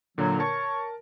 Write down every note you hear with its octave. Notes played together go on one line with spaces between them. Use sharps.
A#2 D3 F#3
A#4 C#5 A5 C#6